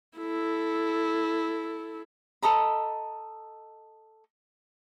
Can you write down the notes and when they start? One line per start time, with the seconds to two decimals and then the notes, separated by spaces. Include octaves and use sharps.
0.18 E4 A4
2.42 A4 D#5 A#5 B5